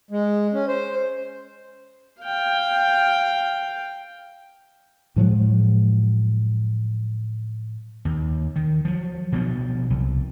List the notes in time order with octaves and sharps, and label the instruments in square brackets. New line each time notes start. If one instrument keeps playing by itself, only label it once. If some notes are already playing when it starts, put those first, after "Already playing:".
[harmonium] G#3
C#4
C5
[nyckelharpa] F5 G5
[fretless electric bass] A2 F3 F#3 G#3
[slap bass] D#2
D#3
F3 F#3
B2 F3 F#3
C2